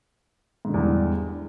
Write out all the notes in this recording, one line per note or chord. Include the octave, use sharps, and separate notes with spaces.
E2 G#2 D3 G3